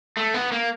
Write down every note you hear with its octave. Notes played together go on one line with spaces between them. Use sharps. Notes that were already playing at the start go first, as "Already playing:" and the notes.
A3
B3
A#3